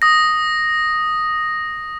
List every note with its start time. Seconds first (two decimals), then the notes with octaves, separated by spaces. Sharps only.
0.02 D#6 A#6